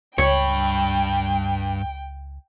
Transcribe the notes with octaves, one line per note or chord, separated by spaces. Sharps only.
C#2 G2 C#5 G5 B5